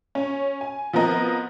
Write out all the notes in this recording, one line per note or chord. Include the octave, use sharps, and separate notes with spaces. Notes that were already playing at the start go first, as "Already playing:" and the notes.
C#4
G#5
F3 B3 C4 A#4 D#5